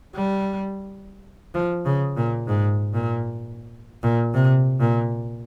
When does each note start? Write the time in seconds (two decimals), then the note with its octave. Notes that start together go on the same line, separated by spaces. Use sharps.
0.15 G3
1.55 F3
1.86 C#3
2.17 A#2
2.48 G#2
2.94 A#2
4.03 A#2
4.34 C3
4.80 A#2